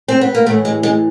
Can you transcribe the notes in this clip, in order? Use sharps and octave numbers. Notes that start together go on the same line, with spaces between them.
C4
B3
A#3
A2 E3 A3
G#3
G#3